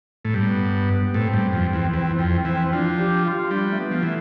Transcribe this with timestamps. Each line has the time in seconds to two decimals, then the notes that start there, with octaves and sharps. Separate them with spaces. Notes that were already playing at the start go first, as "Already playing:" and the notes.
0.25 A2
0.34 G2 B3
1.13 A2 C4
1.33 G2
1.53 F2
1.73 E2
1.93 E2
2.19 F2
2.45 E3
2.73 F3 D4
2.99 G4
3.25 F4
3.51 G3 D4
3.72 A3
3.78 B3
3.91 F3 B3
4.03 E3 A3